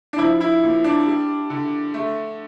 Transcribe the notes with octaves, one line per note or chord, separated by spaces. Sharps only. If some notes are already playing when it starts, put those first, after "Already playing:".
D4
F3 E4
E4
A#2
D4
G3
D3
A3